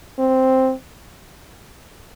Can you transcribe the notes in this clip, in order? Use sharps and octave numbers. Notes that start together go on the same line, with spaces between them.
C4